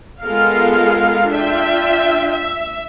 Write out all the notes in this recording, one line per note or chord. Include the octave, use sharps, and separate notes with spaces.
G#3 B3 F4 A4 A#4 F5
D4 F4 E5 G5
E5